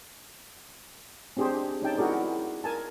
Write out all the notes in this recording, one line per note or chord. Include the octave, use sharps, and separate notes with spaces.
C4 D4 G4 G#4 C5
C#4 D#4 G5 A5
E4 F#4 G#4 A#4 D5
A#4 G#5 A5